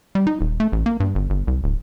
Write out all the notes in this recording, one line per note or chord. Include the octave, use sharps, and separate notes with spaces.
G3
D#4
D#1
A3
A1
A#3
G2
G1
G1
C2
D1